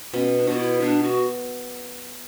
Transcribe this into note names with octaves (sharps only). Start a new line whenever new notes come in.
B2 C#4
D4
B2 F#4
E4
B3 D4
F#4